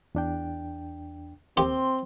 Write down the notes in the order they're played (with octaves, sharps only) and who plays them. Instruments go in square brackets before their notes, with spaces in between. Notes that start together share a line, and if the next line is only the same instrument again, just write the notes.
[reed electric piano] E2 D4 G5
[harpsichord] D#2 G4 [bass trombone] C4 [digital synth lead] C6